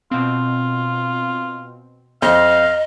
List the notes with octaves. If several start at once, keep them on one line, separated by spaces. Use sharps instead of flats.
B2 C4 F4
F2 C5 D#5 F5 A#5